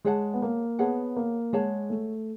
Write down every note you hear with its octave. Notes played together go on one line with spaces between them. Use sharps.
G#3 G#4 C#5 F#5 A5
B3
A#3
B3 G#4 C#5 F#5 A5
A#3
G#3 G#4 C#5 F#5 A5
A3